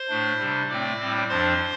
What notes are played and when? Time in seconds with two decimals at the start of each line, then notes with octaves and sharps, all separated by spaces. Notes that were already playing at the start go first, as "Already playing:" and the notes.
Already playing: C5 C6
0.08 A2 A3 D4
0.38 C3 G3 D4
0.69 A2 A3 C4 D5 D6
1.00 A2 G3 C4
1.29 F2 F3 D4 C5 C6